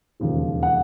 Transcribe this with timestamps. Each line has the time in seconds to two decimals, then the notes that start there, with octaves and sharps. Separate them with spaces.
0.20 E1 D#2 C#3 F3
0.63 F#5